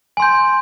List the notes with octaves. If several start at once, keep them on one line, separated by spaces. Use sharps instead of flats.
G#5 C6 G6